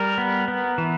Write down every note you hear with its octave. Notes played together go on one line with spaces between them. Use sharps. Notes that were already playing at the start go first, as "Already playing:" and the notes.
Already playing: G3 A#4
B3
B3
E3